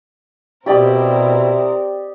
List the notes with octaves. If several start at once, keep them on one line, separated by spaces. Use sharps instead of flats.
B2 C4 E4 G4 A#4 D5 D#5